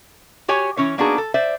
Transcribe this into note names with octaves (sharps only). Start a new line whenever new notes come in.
F#4 G4 C#5 G#5
E3 C#4 C#5
A#3 B3 D4 D#4 F#4 G#4
A4
C5 D5 E5